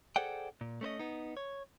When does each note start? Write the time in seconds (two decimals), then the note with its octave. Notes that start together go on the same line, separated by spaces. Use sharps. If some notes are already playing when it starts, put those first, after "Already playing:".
0.16 G#4 A4 C5 D5 F#5 G5
0.61 A#2
0.81 A3 C#4 C5 D#5
0.99 B3 D#4
1.37 C#5